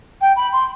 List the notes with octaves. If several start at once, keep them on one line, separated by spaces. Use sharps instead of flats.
G5
B5
C6